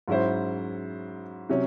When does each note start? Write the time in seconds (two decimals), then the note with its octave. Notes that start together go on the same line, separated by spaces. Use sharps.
0.08 G#2 F#3 C#4 E4 C5
1.49 C3 F#3 C#4